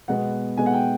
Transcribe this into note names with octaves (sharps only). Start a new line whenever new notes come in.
B2 G#3 B3 F#5
B2 G#3 B3 G#5
F#5
G5